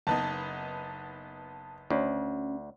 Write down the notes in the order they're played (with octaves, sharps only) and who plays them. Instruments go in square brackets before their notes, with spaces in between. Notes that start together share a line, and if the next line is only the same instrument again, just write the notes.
[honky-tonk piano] F#1 B3 D#4 [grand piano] A5
[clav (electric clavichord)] D2 [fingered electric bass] C#4